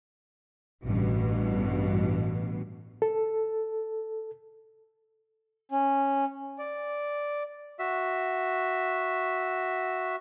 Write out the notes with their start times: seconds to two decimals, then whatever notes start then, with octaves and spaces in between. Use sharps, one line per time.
0.84 A1 G2 B2
3.02 A4
5.71 C#4
6.59 D5
7.79 F#4 E5